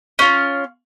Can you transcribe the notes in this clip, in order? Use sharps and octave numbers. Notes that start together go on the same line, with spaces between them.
C#4 F4